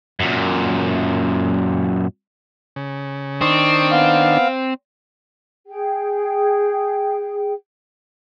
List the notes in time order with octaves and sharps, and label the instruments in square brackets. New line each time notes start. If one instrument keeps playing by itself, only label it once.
[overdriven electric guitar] F#2 A#2
[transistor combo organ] C#3
[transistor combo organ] D#3 D4 [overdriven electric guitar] C4 [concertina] C#6 D#6
[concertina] B3 [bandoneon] F5
[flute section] G#4 G5